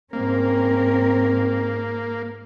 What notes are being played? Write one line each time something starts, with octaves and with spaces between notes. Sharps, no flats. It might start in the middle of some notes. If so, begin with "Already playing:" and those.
G#2 A#3 C4 C#4 A#4